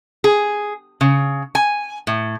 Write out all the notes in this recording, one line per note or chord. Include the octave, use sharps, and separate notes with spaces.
G#4
C#3
G#5
A2